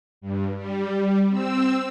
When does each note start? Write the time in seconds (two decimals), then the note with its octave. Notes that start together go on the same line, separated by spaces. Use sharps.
0.21 G2
0.56 G3
1.29 C4 E6